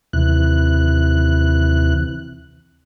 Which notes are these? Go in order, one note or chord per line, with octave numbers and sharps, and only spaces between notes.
D#2 C3 E3 F#6